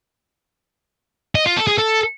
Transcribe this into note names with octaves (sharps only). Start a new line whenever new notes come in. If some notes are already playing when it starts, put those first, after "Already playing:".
D#5
F4
A4
G#4
A4